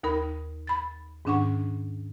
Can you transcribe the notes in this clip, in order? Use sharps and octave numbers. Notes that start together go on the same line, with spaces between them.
D#2 D#4 A#4 B5
B5 A6
G#2 D#3 C#4 D4 F#5 C#6